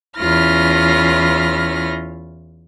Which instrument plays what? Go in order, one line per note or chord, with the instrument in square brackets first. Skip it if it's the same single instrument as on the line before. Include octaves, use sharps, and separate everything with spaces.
[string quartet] E2 C#4 E4 F4 F6 A#6